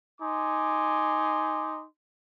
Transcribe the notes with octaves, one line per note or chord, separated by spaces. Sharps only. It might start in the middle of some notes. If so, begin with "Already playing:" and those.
D#4 G#5 C6 D6